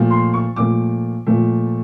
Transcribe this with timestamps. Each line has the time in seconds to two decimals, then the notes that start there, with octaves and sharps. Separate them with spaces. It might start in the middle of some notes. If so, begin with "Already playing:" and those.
Already playing: A#2 F3 A3
0.11 C6
0.34 C#6
0.56 A#2 F3 A3 D6
1.27 A#2 F3 A3